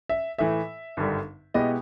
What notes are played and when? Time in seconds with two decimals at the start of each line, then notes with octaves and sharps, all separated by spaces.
0.09 E5
0.38 A2 E3 A3 E5
0.97 G#1 G2 D3 G3
1.54 B2 G#3 B3 E4 G4 D#5